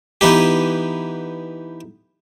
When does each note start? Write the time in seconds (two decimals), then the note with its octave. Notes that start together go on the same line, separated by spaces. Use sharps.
0.21 E3 B3 D#4 G4